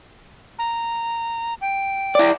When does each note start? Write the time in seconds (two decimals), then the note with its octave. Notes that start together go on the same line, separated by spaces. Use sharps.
0.59 A#5
1.61 G5
2.15 E4 D5